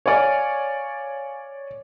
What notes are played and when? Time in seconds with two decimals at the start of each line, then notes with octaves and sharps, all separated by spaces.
0.06 C#5 D5 F5 G#5 F6